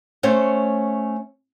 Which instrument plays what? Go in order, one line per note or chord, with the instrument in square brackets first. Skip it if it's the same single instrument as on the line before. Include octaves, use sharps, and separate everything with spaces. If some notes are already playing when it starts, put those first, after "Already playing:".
[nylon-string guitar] A3 C#4 C5 C#5